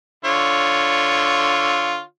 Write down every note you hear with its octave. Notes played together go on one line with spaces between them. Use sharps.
D3 F4 C#5